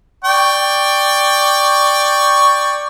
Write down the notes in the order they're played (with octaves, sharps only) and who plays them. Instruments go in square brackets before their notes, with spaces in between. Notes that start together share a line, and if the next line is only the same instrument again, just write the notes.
[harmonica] D5 G5 C#6